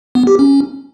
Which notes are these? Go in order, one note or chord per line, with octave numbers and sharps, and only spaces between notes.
B3
G4
C#4